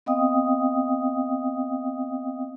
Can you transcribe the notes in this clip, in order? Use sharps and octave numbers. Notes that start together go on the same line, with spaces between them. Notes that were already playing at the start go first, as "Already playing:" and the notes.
B3 C4 D#5 F5 G5 D#6